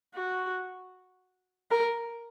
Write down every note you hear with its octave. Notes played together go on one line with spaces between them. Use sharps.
F#4
A#4